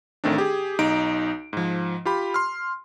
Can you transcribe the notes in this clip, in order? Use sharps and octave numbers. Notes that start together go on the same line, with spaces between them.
A1 D#3 A3 C4 D4
G4 G#4
B1 D#4 D7
G#2 F3
F4 G4 B5
C6 F6